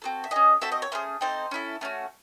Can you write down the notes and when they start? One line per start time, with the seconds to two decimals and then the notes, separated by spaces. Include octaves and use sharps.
0.02 C4 F#4 A4
0.24 E5
0.31 C#4 G#4 D#5
0.61 C4 F#4 A4 E5
0.72 D#5
0.82 C#5
0.92 A3 C#4 G#4 C5
1.21 C4 D#4 A4 C5
1.51 C#4 E4 A4
1.81 A3 C#4 F#4